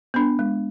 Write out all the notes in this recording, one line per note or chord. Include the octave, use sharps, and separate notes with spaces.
B3 D4
G#3